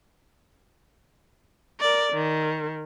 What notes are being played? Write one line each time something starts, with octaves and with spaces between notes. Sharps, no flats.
A#4 D5
D#3